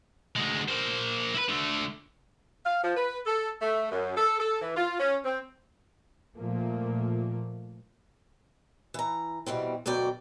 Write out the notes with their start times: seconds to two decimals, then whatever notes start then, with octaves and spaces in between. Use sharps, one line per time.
0.36 D2 G#3
0.68 A#3 C5
1.35 E4 B4
1.49 D3 A3
2.66 F5
2.83 F3
2.97 B4
3.26 A4
3.61 A3
3.92 F#2
4.17 A4
4.40 A4
4.61 E3
4.77 F4
4.99 C#4
5.25 C4
6.36 A#2 F3 A3 A#3
8.94 E3 A#5
9.46 B2 E3 G3 C4
9.86 D2 B2 F#3 D5 G5